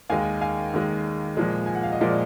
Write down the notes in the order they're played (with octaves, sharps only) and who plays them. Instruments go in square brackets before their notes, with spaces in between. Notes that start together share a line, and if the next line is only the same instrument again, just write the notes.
[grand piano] D#2 D#3 G#3 F5 G#5
F5 G#5
D#2 D#3 G#3
A#2 F3 G#3
G#5
F#5
F5
D#5
A#2 F3 G#3 A#4 D5